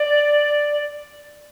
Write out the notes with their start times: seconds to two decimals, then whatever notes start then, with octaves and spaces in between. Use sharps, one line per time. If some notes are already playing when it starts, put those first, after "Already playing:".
Already playing: D5